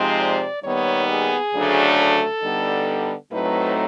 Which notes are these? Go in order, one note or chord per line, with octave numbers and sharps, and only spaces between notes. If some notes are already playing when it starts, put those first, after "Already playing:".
Already playing: C3 F3 G#3 C4 D#4
D5
D#2 D#3 G3 B3 D#4 C#5
G#4
D2 C#3 F#3 A3 D4
A4
D3 G3 B3 D#4
A2 F#3 A3 C4 D#4 B4